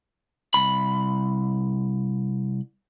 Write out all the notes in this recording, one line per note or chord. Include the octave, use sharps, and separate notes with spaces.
C2 B5